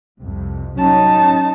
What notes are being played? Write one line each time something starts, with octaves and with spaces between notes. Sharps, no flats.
C2 F2 C3
F#3 C#4 D#4 A5